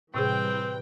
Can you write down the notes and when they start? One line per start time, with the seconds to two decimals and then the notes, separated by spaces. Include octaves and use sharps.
0.14 A2 C3 E3 G3 C4 G#4 B4 G5